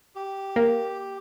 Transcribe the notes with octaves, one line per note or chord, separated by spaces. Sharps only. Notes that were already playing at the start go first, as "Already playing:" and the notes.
G4
A#3